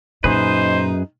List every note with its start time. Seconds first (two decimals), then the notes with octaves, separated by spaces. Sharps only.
0.24 F#2 A#2 D#4 G#4 B4 C5